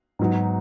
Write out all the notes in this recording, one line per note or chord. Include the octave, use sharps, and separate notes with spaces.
G#2 F#3 B3 D#4 F#4